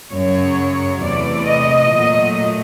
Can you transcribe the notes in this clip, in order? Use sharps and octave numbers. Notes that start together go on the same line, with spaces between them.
F#2 C#3 F#3 C#5
E2 C3 E3 A3 D5
D#5
A#2 F#3 A3